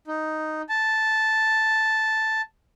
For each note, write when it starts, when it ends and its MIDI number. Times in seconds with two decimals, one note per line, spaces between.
0.07 0.62 63
0.69 2.41 81